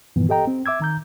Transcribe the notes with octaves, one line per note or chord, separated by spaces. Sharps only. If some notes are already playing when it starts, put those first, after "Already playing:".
G2 A#2 D#3 E3 B3
G4 A4 D#5 G5 A#5
C4
E5 D6 E6 G#6
D#3 A#5 G6